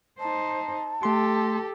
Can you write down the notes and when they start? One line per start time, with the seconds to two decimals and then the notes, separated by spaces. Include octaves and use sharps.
0.20 D#4 C5 A5
1.03 A3 G4 A4 C6